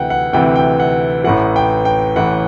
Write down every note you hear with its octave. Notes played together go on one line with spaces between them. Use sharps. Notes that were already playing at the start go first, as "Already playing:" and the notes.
Already playing: D2 C3 E3 F#5 G5
F#5
D2 C3 E3 G5
G5
F#5
A1 A2 E3 F#5
G5
G5
A1 A2 E3 F#5